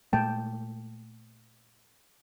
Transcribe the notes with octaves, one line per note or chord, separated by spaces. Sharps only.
A#2 G#3 A3 G5 A5